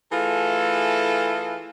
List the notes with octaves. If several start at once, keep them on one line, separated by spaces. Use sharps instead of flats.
E3 A3 F4 G#4 A4